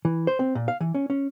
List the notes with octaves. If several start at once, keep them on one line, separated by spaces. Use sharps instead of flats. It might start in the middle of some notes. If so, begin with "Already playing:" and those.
E3
C5
C4
A#2
F5
E3
C#4
C#4